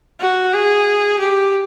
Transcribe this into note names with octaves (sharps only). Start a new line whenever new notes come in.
F#4
G#4
G4